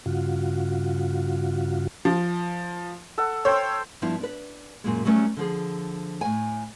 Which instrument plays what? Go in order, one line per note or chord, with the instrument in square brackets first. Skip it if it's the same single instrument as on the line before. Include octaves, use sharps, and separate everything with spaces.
[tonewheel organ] G2 C#3 F4 F#4
[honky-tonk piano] F3
[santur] A4 F#5
[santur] A4 C5 G5 [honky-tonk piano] C#5
[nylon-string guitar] G2 F3 B3 D4 E4
D4 B4
F#2 A#2 G#3
F#3 G3 A3 C#4 B4
D3 F3 G#4
A2 G#5